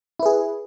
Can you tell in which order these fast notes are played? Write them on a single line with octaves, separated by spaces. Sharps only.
E4 B4 G#4